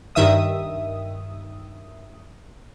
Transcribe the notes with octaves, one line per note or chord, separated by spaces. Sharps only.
G2 D#3 E5 D#6